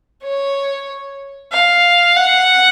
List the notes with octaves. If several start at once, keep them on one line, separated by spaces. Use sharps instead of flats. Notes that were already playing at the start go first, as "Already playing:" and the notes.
C#5
F5
F#5